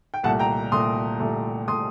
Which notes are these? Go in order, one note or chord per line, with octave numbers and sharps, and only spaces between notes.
G5
C2 A#2 A3 F#5 A5
G5 A#5
C2 A#2 A3 C6 D#6
C2 A#2 A3
A#2 A3 C6 D#6